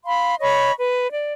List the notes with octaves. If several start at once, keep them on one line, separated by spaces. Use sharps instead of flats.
F5 B5 C6
C#5 D#5 B5 C#6
B4
D5